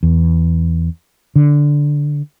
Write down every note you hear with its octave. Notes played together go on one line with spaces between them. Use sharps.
E2
D3